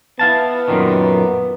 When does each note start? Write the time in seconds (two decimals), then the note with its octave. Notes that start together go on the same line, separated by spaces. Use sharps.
0.19 B3 E4 F5 A5
0.68 F#2 A#2 D#3